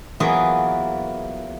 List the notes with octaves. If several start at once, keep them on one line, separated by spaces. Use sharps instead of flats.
E3 F#3 A#3 B3 F4 G#4